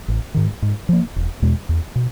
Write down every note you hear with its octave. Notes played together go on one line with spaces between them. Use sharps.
A1
G#2 D#3
G#2
F3 A#3
E1
E2 B2 G#3
E2
B2